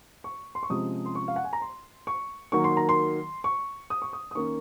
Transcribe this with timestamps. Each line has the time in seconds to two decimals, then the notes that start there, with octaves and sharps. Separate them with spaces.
0.24 C#6
0.55 C6
0.63 C#6
0.70 C3 F3 G#3 C#4 D#6
1.06 C6
1.15 C#6
1.28 F5
1.36 F#5
1.44 G#5
1.53 A#5
1.62 C6
2.07 C#6
2.52 D#3 F#3 A#3 C#6
2.64 C6
2.77 A#5
2.89 C6
3.44 C#6
3.90 D#6
4.02 C#6
4.13 D#6
4.31 D#6
4.35 D#3 A#3 C#4 C#6